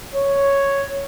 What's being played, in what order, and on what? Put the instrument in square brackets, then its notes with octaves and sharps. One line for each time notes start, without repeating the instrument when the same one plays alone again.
[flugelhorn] C#5